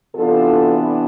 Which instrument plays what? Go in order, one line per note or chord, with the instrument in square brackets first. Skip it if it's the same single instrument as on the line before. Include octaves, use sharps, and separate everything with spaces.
[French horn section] C3 E3 B3 D4 F4 A4